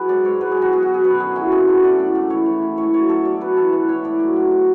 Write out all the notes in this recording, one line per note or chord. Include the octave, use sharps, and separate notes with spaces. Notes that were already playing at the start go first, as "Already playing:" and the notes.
Already playing: F#3 G#4 B4
G#2 D5
G#2 C#5
F#3 B4
F#3 G#4
F#4
B2 G#4
F#4
B2
G#4
F#2 B4
D3 G#4
F#3 E4
F#2 G#4
F#3 A4
F#3 D5
A2
A2
E3 C#5
E3
A2
A2 C#5
F#3 C#5
F#3 A4
B2 D5
B2 B4
E3 A4
E3 B4
A2 C#5
A2 D5
F#3
F#3
B2